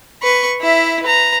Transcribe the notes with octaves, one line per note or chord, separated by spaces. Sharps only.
B4 C#6
E4 E5
B4 A#5